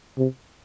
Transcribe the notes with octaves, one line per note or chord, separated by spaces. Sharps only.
C3